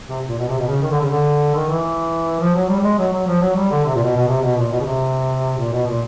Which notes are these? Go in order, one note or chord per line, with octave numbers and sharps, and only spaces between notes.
C3
A#2
B2
C3
B2
C#3
D#3
D3
C#3
D3
D#3
E3
F3
F#3
G3
G3
G#3
F#3
F#3
F3
F#3
G3
D3
C3
A#2
B2
B2
C3
B2
A#2
B2
C#3
C3
A#2
B2
A#2